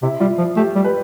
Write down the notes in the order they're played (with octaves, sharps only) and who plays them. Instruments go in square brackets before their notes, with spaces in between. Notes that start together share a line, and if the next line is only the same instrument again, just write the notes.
[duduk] C3 [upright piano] E4
[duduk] G3 [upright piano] F4
[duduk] F3
[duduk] A3 [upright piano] G4
[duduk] G3
[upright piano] B4